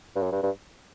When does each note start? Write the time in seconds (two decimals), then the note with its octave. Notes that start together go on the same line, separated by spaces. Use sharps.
0.16 G2
0.22 F#2
0.32 G2
0.43 G2